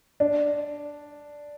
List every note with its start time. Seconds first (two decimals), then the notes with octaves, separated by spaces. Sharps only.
0.20 D4